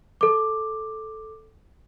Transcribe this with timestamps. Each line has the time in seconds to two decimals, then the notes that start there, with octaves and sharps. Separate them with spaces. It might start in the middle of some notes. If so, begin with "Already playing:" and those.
0.21 A4 D6